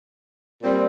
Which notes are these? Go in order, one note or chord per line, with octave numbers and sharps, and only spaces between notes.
A#2 G3 C4 F4